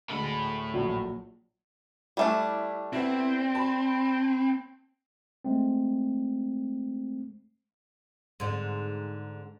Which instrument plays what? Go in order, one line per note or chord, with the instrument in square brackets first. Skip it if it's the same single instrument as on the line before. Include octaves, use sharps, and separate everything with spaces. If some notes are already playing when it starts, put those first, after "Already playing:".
[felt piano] D2 D3 G#3 [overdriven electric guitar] A2 B5
[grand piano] A#1 F#3
[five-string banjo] G3 A3 D4 [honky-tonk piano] E4
[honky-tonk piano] B3 E4 [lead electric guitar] C4
[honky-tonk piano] A5 B5
[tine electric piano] G#3 A3 C4
[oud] G#2 D3